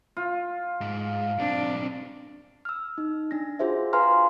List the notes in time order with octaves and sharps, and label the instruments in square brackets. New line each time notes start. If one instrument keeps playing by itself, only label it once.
[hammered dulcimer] F4
[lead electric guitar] G#2
[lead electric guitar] B1 C4 [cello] D4
[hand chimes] E6 F6
D#4
D4 A#6
F4 F#4 G#4 C5 E5
B4 F5 G#5 A#5 C6 F6